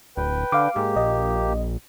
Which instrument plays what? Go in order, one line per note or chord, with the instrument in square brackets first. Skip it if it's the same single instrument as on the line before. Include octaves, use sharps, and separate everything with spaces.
[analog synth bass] D1 [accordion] B4 G5
[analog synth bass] D3 [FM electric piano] F5 D6
[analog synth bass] G#2 [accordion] A#3 G4
[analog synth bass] A#1 [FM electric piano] D#5